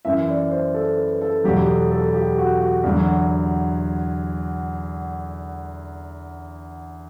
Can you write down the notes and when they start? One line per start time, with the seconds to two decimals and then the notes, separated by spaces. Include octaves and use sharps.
0.05 F#2 E3 E5
0.29 D5
0.51 C5
0.74 A4
0.98 B4
1.22 A4
1.44 E2 B2 F#3 G4
1.67 A4
1.91 A4
2.14 G4
2.38 F#4
2.60 F#4
2.84 E2 D3 F#3